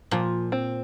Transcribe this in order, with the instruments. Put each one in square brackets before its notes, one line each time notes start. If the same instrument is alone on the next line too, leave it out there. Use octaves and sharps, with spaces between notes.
[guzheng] A#2 [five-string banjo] F3
[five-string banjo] C4